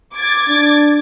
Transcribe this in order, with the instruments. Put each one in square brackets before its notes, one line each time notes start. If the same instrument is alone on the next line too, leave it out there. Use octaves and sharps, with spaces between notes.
[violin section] D6 G#6 A6
[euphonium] D4